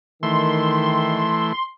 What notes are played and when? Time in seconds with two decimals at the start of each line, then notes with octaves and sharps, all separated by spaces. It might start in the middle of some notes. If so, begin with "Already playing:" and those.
0.23 D#3 E3 A3 C6